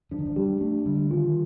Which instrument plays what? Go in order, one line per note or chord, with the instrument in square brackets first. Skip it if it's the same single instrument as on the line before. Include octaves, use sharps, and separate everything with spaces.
[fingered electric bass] F3 [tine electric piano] D4
[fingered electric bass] D#3
F3
[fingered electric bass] G3 [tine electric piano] G4
[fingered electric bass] A3 [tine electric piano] D4
[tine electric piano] D3 [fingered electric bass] G3
[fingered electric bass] D#3 [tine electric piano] F4